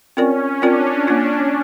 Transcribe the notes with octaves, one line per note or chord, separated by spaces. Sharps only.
C4 C#4 F4 A#4 D5
C4 D4 F4 A#4 D5
A#3 D4 F4